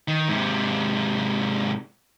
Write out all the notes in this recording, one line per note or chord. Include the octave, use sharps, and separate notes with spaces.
D#3
G#2 C3